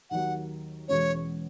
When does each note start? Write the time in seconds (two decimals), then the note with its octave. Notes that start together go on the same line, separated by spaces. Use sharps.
0.10 D#2 D#3 F#3 F#5
0.88 E1 E2 B2 G#3 C#4 C#5